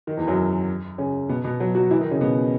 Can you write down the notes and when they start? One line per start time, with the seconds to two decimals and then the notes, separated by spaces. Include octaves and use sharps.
0.07 D#3
0.17 E2 E3
0.27 F#2 F#3
0.98 C#3 C#4
1.29 B2 B3
1.44 B2 B3
1.60 F#3 F#4
1.75 F#3 F#4
1.91 E3 E4
2.01 D#3 D#4
2.11 C#3 C#4
2.21 B2 B3